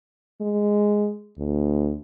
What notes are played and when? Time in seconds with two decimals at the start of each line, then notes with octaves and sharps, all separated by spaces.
0.41 G#3
1.38 D2